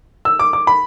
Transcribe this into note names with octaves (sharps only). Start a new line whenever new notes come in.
E6
D6
D6
B5